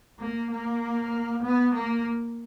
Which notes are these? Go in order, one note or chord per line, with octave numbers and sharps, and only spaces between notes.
A#3
A#3
B3
A#3